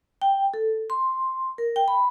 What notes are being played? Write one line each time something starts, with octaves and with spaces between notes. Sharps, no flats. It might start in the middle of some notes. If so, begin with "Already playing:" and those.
G5
A4
C6
A#4
G5
B5